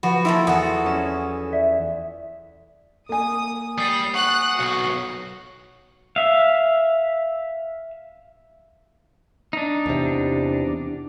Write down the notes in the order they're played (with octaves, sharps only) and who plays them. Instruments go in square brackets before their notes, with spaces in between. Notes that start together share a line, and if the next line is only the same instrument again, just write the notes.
[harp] F3 [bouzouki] F#4 [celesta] B4 B5
[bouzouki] E3 G#3 A#3 [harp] E4 A4 [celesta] C6
[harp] E2 [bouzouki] F#4 A4 [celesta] D#6
[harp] C#4 E7
[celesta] D5 E5 B6
[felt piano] A#3 G#5 [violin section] D#6
[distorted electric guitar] G3 D5 [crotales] D#6 C7 D#7
[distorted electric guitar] F#5 [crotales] C#6 [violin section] F#6
[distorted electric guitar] B1 [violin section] F#4
[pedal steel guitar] E5 F5
D4 D#4
[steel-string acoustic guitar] E2 C3